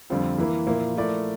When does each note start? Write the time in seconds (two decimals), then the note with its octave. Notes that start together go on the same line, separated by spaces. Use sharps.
0.10 F2 D3 G3 C4 F4
0.38 E3 A#3 E4
0.67 A#2 F3 A#3 E4
0.96 F3 A3 E4 A#4 D5